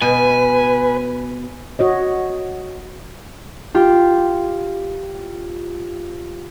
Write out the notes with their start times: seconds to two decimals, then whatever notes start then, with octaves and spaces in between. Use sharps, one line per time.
0.02 B2 B4 G#5
1.79 F#4 C#5 D#5
3.74 F4 G4